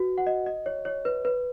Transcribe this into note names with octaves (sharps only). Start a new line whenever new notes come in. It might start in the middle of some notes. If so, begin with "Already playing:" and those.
Already playing: F#4 B4
F#5
D#5
D#5
C#5
C#5
B4
B4